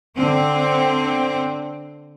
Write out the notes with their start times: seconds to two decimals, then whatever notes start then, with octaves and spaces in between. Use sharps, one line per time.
0.17 D3 C4